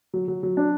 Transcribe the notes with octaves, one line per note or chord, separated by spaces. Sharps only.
F#3
F#3
F#3
D4